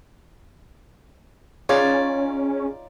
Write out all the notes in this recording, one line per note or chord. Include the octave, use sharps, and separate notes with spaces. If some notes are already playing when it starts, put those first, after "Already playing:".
C#4 D#4 F4 G#4 C#5 D5 A6